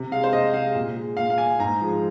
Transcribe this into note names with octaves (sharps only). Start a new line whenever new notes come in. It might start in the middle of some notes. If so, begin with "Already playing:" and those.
Already playing: C3
G#3 F5
C5
C3 D#5
G#3 F5
A#2
G#3
A#2 F5
F5
G#3 G#5
G#2 A#5
F3 G#3